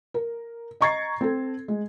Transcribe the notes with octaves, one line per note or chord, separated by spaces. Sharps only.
A#4
D#5 A#5 C#6 G#6 A6 C7
C4 A4
G#3